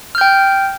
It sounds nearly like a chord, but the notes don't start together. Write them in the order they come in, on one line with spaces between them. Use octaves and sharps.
F6 G6 G5